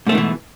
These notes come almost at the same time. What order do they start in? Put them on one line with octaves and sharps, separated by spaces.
G#2 A3 D#3 B2 E3